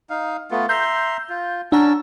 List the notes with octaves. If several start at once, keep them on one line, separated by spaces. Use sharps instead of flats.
D#4 F5
A3 B3 F4
E5 A#5 C6 G6
F4
C#4 D4 F#5 A5 A#5 E6